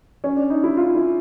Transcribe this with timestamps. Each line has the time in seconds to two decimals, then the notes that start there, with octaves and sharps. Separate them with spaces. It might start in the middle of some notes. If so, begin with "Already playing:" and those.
0.24 C#4
0.37 D4
0.50 D#4
0.64 E4
0.77 F4
0.95 E4